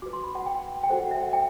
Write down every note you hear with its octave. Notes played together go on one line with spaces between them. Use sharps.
F#4 B4 D6
C6
B5
F#5
G5
G5
F#4 A4 C5 F#5
F#5
E5
F#5
G5